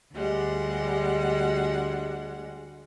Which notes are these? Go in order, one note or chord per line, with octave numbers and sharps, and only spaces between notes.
D2 G3 G#3 F#5